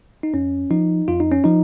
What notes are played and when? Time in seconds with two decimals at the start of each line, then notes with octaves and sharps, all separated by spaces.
0.23 D#4
0.34 F2 C#4
0.71 F3 D#4
1.08 F2 F4
1.20 D#4
1.32 C#4
1.44 F3 D#4